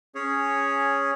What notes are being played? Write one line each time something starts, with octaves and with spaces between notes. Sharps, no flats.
C#4 G#4 C#5